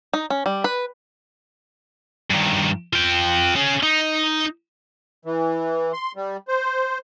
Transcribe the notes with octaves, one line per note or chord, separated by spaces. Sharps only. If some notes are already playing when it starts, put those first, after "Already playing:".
D#4
C#4
G3
B4
G2 D#3
F4 G5
C#4 G#4
D#4
E3
C6
G3
C5